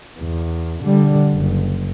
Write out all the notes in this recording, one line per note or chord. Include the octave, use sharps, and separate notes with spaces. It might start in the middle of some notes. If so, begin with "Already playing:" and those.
E2
D3 G3
F#1